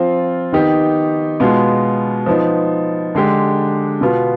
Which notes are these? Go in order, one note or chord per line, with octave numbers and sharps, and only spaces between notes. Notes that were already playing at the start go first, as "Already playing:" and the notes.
Already playing: F3 C4 F4
D#3 B3 D#4 G4
B2 G#3 B3 F4
F3 B3 D#4
D3 G#3 D4 G4
B2 B3 F4